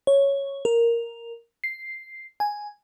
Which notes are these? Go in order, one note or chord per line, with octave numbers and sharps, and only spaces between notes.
C#5
A#4
C7
G#5